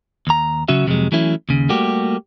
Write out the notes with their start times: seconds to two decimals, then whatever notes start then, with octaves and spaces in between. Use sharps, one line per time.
0.27 D#2 A#5
0.68 C#3 F#3 C#4 F#4 E5
0.87 F2 C3 D#3 F#3 G#3
1.12 E3 F#3 A3 C#4 E4
1.49 D#2 C#3
1.69 G3 A3 A#3 F#4 G4